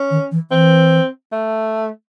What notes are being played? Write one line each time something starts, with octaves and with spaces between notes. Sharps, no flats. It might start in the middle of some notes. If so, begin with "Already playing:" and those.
Already playing: C#4
D#3
E3
E3 C4
A3